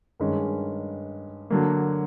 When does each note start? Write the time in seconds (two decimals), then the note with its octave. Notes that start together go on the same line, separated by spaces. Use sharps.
0.20 G2 D#3 G#3 C#4
1.50 D3 F#3 A#3